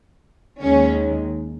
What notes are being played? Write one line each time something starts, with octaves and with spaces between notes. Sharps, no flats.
D#2 D#3 G#3 C#4